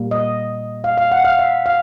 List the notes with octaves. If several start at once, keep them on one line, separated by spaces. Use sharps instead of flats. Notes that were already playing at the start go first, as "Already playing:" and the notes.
Already playing: A#2 G3 A#3
D#5
F5
F5
F#5
F5
E5
F5